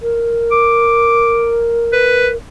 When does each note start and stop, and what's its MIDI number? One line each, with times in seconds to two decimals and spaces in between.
0.02 2.36 70
0.52 1.60 86
1.93 2.28 71